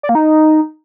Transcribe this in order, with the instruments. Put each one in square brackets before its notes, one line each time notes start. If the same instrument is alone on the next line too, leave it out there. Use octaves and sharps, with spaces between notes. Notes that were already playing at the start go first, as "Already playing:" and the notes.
[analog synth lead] D5
A#3
D#4